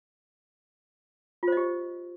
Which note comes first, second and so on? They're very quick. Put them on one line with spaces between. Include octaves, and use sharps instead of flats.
F4 C5 D#5 G4